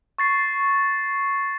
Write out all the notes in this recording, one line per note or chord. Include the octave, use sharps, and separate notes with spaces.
C#6 A6 C7